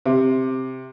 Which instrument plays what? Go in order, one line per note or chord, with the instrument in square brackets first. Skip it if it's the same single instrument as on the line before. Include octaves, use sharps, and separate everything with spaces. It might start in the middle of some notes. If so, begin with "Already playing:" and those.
[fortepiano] C3